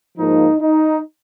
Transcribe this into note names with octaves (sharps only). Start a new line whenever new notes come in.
G#2 F3 A#3 D#4
D#4